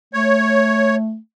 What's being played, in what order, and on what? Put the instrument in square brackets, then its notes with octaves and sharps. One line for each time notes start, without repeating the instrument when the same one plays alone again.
[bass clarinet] A3 [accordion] C#5